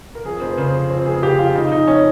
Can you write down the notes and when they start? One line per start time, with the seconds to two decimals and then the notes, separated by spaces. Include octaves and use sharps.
0.15 A#4
0.25 F2 G#4
0.41 F1 C5
0.57 C#3 C5
0.74 F3
0.89 F2 C4
1.06 F1 G#4
1.22 C#3 G4
1.38 F3 F4
1.55 C#3 D#4
1.71 F2 D#4
1.87 F3 C#4